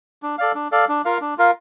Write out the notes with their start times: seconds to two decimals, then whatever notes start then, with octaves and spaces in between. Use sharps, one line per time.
0.22 D4
0.38 A4 D5 F5
0.55 D4
0.72 A4 D5 F5
0.89 D4
1.05 F4 A#4 F5
1.21 D4
1.38 F4 A#4 F5